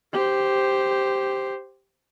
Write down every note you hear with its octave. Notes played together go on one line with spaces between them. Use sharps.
G4 C5